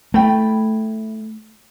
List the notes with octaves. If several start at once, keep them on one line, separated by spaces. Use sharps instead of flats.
A3 E4 G5 B5